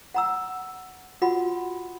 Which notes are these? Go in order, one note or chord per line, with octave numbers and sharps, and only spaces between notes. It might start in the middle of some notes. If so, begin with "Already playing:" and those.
F#5 A#5 E6
F4 F#4 F#5 B5